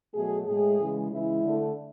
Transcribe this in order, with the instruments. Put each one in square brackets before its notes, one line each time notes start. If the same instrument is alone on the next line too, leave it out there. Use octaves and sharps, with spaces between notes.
[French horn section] B2 F#3 A3 G#4
A2 G#3 G#4
C#3 E3 G#3
C#3 E3 G#3 E4
D3 A3